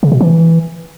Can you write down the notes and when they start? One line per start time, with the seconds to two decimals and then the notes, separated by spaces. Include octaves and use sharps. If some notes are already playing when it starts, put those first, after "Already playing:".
0.03 C#3
0.12 B2
0.21 E3